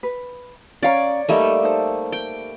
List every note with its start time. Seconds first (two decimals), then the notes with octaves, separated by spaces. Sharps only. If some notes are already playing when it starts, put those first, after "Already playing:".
0.03 B4
0.83 C#4 C#5 D5 F5 A#5
1.29 G3 A3 A#3 D#4 D#5
1.63 D#4 A4 C5
2.12 G5